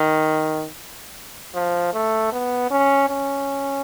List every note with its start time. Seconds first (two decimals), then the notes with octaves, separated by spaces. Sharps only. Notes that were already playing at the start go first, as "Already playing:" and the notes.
Already playing: D#3
1.54 F3
1.93 A3
2.32 B3
2.71 C#4
3.09 C#4